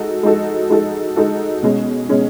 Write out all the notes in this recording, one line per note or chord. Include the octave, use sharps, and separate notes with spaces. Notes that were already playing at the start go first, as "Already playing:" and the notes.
Already playing: G#3 D#4 F#4 A4
G#3 D#4 F#4 A4
G#3 D#4 F#4 A4
G#3 D#4 F#4 A4
B2 G#3 C#4
B2 G#3 C#4